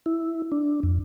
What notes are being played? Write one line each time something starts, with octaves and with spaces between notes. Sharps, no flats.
E4
D4
F2